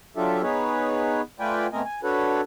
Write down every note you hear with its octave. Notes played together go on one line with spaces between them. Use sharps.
F#3 D4 F4 G4 A4 E5
B3 D#4 G#4 B4 C#5
A3 F4 B4 D5 G5 G#5
B2 A3 C4 A#4 D#5 G#5
G#5
D4 F#4 A4 B4 C#5 F#5